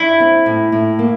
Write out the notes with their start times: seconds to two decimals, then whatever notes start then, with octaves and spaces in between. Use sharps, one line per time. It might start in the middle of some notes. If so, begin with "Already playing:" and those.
Already playing: G2 E4
0.20 C4
0.46 A2
0.72 A2
0.99 A#3